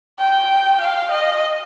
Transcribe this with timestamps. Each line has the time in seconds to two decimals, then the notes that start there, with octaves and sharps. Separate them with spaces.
0.20 G5
0.81 F5
1.11 D#5